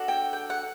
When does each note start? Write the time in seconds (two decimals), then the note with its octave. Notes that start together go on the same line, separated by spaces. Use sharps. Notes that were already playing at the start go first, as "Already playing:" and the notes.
Already playing: D4 F#4 A4
0.08 G5
0.33 G5
0.50 F#5